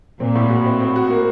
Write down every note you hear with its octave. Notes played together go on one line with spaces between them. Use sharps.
A#2 C4
A2
F#4
C4
C4
F#4
A#3